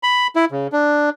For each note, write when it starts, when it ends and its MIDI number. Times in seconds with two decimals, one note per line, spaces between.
0.03 0.27 83
0.36 0.45 64
0.51 0.67 49
0.72 1.10 62